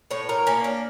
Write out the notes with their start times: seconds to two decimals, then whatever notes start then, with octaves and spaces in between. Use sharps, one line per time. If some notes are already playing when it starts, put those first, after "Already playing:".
0.11 A2 C#5
0.29 A#4
0.47 A#3 C#4
0.64 D4